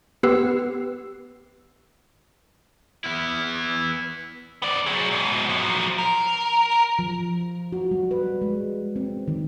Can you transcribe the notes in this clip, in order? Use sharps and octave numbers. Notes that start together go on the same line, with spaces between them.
B3 G4 B4 E6 C7
B3 E4
B3 D5
F#3 G#4
G#2 B2
F3 F#3
A#4
F3
F#4
G3
B4
G#3
C4
D#3